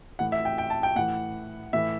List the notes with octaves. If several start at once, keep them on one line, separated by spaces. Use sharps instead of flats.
A2 E3 F#5
E5
G5
G5
A5
G5
A2 E3 F#5
A2 E3 E5